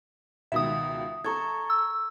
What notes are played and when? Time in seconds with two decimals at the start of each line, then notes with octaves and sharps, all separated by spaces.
0.52 C#2 B2 D#3 E5 D#6
1.25 A4 A#5 C#6 G#6
1.70 E6